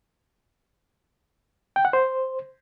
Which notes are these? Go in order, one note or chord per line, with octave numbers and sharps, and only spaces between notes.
G5
F#5
C5